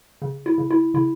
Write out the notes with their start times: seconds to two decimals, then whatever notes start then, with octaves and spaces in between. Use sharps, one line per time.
0.22 C#3
0.46 E4
0.58 C#3
0.71 E4
0.94 C#3 E4